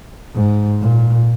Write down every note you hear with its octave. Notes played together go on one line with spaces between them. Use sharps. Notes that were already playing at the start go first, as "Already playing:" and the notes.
G#2
A#2